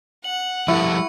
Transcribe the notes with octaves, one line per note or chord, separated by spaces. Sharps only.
F#5 F#7
F3 G3 E4 A4 C#6 C#7